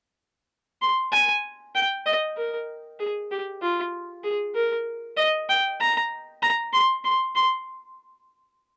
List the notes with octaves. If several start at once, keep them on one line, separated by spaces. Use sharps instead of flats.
C6
G#5
G5
D#5
A#4
G#4
G4
F4
G#4
A#4
D#5
G5
A#5
A#5
C6
C6
C6